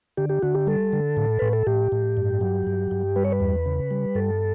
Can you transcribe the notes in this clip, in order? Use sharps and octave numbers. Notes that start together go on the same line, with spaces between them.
D3 G4
G4
D3 F#4
G4
G3 A4
D3
A2
A2 B4
A4
A2 G4
A2
G2
F#3
G2
G2
G3 B4
C#5
B4
E2
C#3
G3
G2 A4